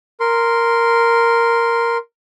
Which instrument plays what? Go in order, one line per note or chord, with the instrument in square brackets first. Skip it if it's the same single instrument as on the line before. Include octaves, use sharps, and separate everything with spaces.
[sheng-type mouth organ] A#4 C6